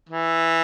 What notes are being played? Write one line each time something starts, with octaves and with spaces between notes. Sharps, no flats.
E3